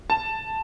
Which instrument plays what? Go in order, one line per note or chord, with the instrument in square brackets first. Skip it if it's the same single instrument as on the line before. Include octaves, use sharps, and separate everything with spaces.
[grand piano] A5